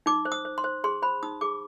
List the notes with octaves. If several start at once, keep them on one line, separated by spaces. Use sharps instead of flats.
D#4 D6
C5
D#6
C5
C6
C5
G#4 C6
C5 B5
D#4 D#6
G#4 D6